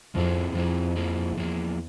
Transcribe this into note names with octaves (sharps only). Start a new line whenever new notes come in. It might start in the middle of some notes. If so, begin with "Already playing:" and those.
F2 F3 C4 E4 G#4
F2 F3 C4 E4 G#4
F3 A#3 E4 G#4
E2 F3 A#3 E4 G#4